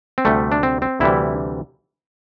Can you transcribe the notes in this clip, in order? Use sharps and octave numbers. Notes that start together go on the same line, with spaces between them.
C4
D2 C3 G3 A3
D4
C4
C4
D2 C3 E3 G3 E4